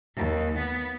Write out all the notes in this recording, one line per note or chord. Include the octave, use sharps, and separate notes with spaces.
D#2
B3